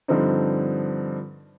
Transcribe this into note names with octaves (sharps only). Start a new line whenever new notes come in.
G2 D3 F3 C4 D#4